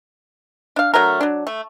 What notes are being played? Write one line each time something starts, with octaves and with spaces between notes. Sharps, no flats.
D4 F5
D3 F#3 A3 A#4
F#3 D4
A3